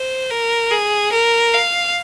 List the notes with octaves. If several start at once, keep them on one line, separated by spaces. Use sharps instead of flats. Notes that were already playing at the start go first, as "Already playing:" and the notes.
Already playing: C5
A#4
G#4
A#4
F5